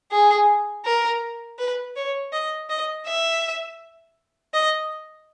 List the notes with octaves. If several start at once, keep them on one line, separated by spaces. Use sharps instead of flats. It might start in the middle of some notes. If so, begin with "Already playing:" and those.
G#4
A#4
B4
C#5
D#5
D#5
E5
D#5